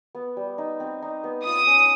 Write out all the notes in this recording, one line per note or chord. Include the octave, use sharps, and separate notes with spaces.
B3
G3
D#4
C4
D#4
B3
F4 D#6
C#4